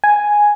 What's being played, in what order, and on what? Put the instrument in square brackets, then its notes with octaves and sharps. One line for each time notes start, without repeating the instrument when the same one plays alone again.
[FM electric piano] G#5